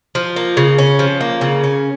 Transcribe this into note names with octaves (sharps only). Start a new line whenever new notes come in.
F3
A#3
C#3
C#4
F3
A#3
C#3
C#4